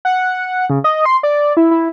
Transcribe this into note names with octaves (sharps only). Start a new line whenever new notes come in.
F#5
C#3
D#5
C6
D5
E4
E4